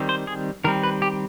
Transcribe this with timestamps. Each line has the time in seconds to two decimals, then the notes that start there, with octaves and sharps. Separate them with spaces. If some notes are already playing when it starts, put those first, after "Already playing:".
Already playing: D#3 G3 C4
0.09 C5
0.27 G#4
0.64 D#3 G3 C4 A#4
0.83 B4
1.02 G4